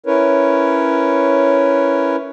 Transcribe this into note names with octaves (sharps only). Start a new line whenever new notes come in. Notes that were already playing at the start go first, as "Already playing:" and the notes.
C#4 E4 A#4 B4 C#5